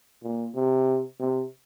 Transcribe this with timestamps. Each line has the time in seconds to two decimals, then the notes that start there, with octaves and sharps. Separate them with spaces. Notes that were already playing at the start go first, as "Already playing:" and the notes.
0.23 A#2
0.55 C3
1.19 C3